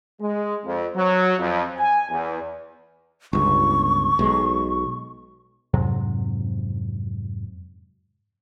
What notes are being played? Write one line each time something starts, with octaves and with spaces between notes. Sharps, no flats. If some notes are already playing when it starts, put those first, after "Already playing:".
G#3
F2
F#3
F2
G#5
E2
G1 C#2 C#6
B1 G#3
F2 G#2 C3 F#3